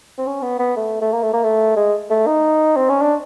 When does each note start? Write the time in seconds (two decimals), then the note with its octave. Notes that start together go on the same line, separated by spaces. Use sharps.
0.18 C4
0.27 C#4
0.42 B3
0.59 B3
0.77 A3
1.02 A3
1.13 A#3
1.23 A3
1.33 A#3
1.44 A3
1.77 G#3
2.10 A3
2.27 D#4
2.76 C4
2.89 C#4
3.02 D4